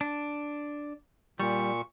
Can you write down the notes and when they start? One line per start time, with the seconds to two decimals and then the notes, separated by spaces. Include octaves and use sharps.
0.01 D4
1.40 A#2 G3 C#6